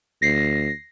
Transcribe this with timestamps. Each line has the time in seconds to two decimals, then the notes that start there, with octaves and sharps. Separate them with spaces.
0.22 D2 A#6 C7